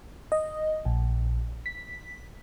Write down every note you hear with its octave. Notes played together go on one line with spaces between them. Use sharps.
D#5
A#1
B6